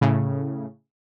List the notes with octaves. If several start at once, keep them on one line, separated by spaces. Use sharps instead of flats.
A2 C#3